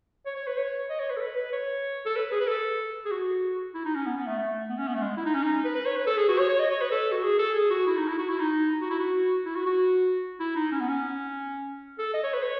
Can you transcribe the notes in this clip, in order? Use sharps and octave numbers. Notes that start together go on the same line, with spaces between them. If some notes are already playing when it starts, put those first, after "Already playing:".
C#5
C#5
B4
C#5
D#5
C#5
B4
A4
B4
B4
C#5
A4
B4
G#4
B4
A4
G#4
F#4
E4
D#4
C#4
B3
B3
A3
A3
B3
C#4
B3
A3
G#3
E4
D#4
C#4
D#4
B4
B4
C#5
B4
A4
G#4
F#4
C#5
C#5
D#5
C#5
B4
A4
F#4
G#4
A4
G#4
F#4
E4
D#4
E4
F#4
E4
D#4
F#4
E4
F#4
E4
F#4
F#4
E4
D#4
C#4
B3
C#4
A4
D#5
C#5
B4
C#5